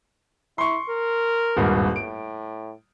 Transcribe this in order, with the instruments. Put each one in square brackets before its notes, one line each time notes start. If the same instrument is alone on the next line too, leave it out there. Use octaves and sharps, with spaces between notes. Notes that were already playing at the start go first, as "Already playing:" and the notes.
[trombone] E4 [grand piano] C6 C#6
[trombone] A#4
[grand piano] D#1 G#1 G2
[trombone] A2 [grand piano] D7